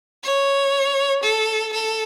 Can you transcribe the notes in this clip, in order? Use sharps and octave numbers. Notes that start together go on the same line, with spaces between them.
C#5
A4
A4